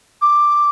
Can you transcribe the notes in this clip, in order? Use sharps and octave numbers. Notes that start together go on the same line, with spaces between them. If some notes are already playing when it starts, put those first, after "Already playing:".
D6